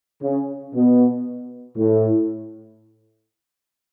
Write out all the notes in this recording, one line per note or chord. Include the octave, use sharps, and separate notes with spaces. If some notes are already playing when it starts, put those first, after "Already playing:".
C#3
B2
A2